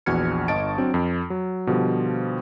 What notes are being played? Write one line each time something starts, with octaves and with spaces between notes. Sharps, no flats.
A#1 E2 F#4 F6 G#6 C#7
G1 D#5 A5 C#6 A6 D7
F#3 C4 D4
F2
F#3
B2 D3 F3 G3